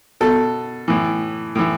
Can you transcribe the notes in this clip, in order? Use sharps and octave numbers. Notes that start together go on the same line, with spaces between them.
B2 A4
A2 E3
A2 E3